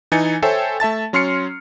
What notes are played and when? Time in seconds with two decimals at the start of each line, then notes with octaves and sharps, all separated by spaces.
0.12 E3 D#4 G#5 A6 C#7
0.42 A4 C5 C#5 E5 G5 G#5
0.80 A3 E5 A5 A6
1.13 F#3 C#4 C6 F6 C7 C#7